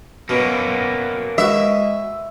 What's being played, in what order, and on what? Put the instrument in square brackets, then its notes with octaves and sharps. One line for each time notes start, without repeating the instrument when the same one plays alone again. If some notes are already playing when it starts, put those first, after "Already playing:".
[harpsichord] B2 [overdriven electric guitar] A#3 C#4 [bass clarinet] B3
[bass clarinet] G#3 [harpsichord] F#4 B4 [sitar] E5